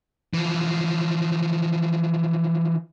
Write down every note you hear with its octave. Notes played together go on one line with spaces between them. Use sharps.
E3 F3